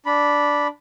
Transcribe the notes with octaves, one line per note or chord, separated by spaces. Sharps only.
D4 B5